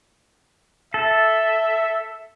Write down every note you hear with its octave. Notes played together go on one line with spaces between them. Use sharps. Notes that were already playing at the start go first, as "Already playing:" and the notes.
A4 E5